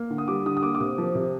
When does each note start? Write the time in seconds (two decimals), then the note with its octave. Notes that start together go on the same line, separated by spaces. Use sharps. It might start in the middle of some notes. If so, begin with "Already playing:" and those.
Already playing: A#3
0.10 D3
0.18 D#6
0.28 G3 D6
0.46 D3 D#6
0.57 D#6
0.63 A#3 D6
0.75 D6
0.80 C3 D#6
0.98 F3
1.15 C3